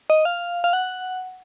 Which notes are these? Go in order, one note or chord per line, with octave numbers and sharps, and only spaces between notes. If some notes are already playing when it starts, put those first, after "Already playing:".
D#5
F5
F5
F#5